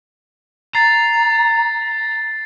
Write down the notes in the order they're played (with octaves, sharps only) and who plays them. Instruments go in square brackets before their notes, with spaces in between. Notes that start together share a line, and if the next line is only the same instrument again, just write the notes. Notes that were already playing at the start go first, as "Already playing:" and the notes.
[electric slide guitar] A#5 [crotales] A6 C7